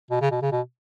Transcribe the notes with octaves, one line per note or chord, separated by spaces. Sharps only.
B2
C#3
B2
C#3
B2